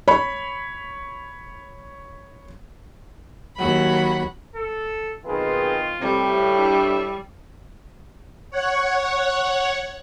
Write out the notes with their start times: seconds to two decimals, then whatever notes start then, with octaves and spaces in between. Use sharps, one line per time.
0.08 C#5 B5
3.57 D#2 F#3 F#5 B5
4.56 A4
5.25 B1 D#3 C4 F4 G#4 B4
6.01 A2 C3 G3 A3 C4
6.57 D4 E4 E5
8.50 C#5 F#5